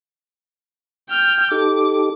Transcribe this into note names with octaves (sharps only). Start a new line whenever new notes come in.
G5 F6
D#4 G4 A4 D6